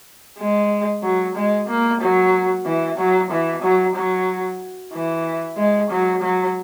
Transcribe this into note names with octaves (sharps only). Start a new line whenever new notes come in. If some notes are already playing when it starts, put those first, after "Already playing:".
G#3
F#3
G#3
A#3
F#3
E3
F#3
E3
F#3
F#3
E3
G#3
F#3
F#3